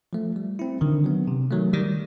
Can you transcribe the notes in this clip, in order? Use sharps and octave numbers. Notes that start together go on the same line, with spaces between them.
F3 A3
G3
C4 E4
D3 D#3
F#3 B3
C3
D#3 F#3 A3
D#3 G3